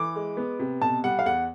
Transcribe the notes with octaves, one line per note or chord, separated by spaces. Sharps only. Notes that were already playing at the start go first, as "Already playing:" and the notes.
Already playing: E3 D6
G#3
B3
C3
B2 A5
G3 F#5
F5
E2 F#5